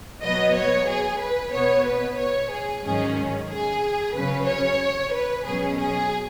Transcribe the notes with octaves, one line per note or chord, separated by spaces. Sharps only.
B2 F#3 B3 D#5
C#5
G#4
B4
B2 B3 C#5
B4
C#5
G#4
G#2 D#3 F#3 C#4 G#4
G#4
C#3 F#3 C#4 B4
C#5
B4
B2 F#3 C#4 G#4
G#4